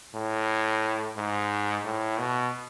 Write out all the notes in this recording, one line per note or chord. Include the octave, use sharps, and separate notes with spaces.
A2
G#2
A2
B2